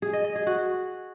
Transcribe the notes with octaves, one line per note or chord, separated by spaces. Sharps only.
G#4
D#5
D#5
G#4
F#4